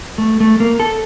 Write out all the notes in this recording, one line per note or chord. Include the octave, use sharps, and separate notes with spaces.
A3
A3
A#3
A4